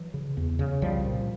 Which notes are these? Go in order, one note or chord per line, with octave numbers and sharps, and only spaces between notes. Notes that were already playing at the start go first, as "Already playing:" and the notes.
Already playing: E3 F#3
C#3
E2
C#3
C2 F3 G3
A#2